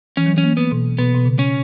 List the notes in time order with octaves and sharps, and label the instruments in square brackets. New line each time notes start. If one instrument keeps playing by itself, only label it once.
[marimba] E3 [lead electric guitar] C#4
[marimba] F#3
[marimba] E3 [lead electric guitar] C#4
[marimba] A#3
[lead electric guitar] B3
[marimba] B2
[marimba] B2 [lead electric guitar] B3
[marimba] B2
C#3
[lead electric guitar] C#4